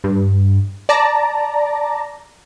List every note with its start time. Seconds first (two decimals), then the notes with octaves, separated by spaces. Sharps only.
0.04 G2
0.89 D5 A5 A#5